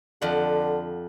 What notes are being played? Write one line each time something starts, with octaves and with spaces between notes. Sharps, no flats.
F2 D3 F#5